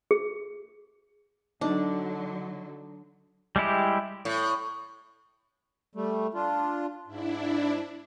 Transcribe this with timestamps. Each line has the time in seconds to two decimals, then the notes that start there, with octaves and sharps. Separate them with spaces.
0.11 G#4
1.61 D3 F#3 D4 D#4
3.56 G3 G#3 E4 G4
4.25 A2
5.95 G3 A3
6.34 D4 F4
7.07 G#2 D4 E4